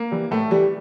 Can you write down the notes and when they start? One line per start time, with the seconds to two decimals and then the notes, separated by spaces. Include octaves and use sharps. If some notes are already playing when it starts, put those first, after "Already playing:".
Already playing: A#3
0.11 E3 G3
0.31 A2 A3
0.51 E3 G3